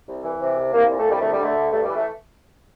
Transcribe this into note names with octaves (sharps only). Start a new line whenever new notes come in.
C2
E3
C3
C2
C2 A#3
A#2
A3
C2 G3
D2 A3
G3
D3
A3
D2
G2 A3
E3 G3
A3